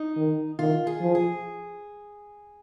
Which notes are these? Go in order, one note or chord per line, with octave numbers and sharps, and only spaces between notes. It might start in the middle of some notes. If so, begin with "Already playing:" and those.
Already playing: D#4
D#3
D#3 F4
G#4
F3
G#4